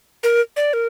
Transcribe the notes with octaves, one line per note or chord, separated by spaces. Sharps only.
A#4
D5
A#4